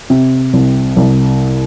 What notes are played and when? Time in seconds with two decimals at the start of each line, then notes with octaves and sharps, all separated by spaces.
0.10 C3
0.53 C2
0.96 C2